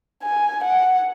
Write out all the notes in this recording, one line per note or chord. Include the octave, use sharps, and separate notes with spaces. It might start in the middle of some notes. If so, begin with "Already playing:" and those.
G#5
F#5